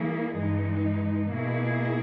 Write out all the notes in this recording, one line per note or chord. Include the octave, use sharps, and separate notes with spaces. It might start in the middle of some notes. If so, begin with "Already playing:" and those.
Already playing: E3 G3 A#3 E4 G#4
G2 E3 G#3 D#4
B2 A#3 E4 G#4